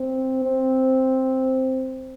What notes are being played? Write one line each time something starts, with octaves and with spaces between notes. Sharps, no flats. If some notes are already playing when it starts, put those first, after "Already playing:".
Already playing: C4
C4